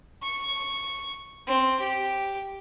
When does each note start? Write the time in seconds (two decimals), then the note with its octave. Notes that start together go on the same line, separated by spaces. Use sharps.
0.23 C#6
1.47 C4
1.80 G4